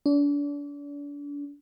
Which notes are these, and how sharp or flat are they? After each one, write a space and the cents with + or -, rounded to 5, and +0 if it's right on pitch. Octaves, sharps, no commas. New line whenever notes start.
D4 -35